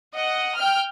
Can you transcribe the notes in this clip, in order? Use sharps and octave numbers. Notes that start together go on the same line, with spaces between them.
D#5 F#5
G5 F6